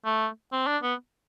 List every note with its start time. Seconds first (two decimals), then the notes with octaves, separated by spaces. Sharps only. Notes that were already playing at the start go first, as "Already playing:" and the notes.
0.05 A3
0.52 C4
0.67 D4
0.83 B3